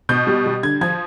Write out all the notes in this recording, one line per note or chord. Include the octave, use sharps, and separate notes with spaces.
B2 G6
G3
G3
D3 G#6
F3 G#6